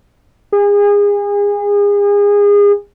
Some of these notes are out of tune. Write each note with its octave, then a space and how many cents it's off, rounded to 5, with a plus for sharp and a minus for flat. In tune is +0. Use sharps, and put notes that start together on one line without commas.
G#4 -30